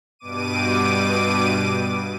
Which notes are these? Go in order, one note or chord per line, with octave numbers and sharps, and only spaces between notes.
G2 B2 D6 D#7